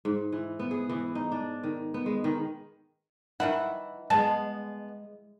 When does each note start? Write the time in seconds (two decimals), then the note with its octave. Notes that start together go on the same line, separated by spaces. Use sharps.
0.05 G#2
0.32 E3
0.59 B3
0.71 G#4
0.89 E3
1.15 D#4
1.32 D4
1.63 D#3
1.94 B3
2.06 G#3
2.24 D#3
3.40 D#3 E3 E4 F#5
4.10 G#3 B3 A5